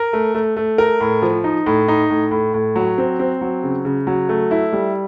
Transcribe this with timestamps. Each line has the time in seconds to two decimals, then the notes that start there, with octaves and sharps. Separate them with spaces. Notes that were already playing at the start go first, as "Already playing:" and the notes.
Already playing: A#4
0.13 A3
0.34 A3
0.57 A3
0.78 A#4
1.01 A2
1.22 F3
1.44 D#4
1.66 A2
1.88 D#4
2.10 A2
2.31 A2
2.54 A2
2.76 F#3
2.98 C4
3.19 C4
3.41 F#3
3.63 C#3
3.85 C#3
4.07 F#3
4.29 A3
4.51 E4
4.73 G3